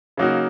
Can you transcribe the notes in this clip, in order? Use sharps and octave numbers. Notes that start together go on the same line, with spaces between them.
C#3 F#3 A#3 D#4 F#4